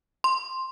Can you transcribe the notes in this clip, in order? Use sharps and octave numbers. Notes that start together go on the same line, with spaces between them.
C6